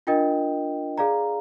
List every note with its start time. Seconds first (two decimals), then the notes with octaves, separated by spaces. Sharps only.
0.07 D4 F4 A#4 D#5 G5
0.98 G#4 D5 F5 A#5